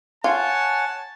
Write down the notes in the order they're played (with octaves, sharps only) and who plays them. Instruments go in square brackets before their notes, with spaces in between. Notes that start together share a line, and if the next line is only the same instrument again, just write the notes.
[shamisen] F4 [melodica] C#5 F#5 G#5 [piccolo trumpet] A5